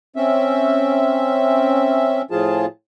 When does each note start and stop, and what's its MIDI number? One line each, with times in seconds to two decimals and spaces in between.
0.16 2.22 60
0.16 2.22 61
0.16 2.22 76
2.31 2.66 45
2.31 2.66 53
2.31 2.66 65
2.31 2.66 68
2.31 2.66 81